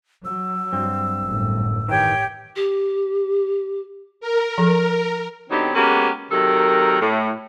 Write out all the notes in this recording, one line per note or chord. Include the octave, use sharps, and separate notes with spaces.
F#3 E6
G2 C4
G1 F#2 A2
D#3 E3 G4 C#5 G5
G4
A#4
F3 A4
D3 F#3 B3 C4 D#4 G4
G#3 A#3 B3 C#4 F#4 G4
C3 D#3 F#3 A4 A#4
A2